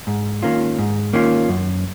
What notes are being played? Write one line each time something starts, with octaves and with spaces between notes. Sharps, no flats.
G#2
D#3 A#3 C#4 F4
G#2
D#3 A#3 C#4 F4
F#2